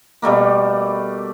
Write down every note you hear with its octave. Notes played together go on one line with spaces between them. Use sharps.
B2 G3 A3 A#3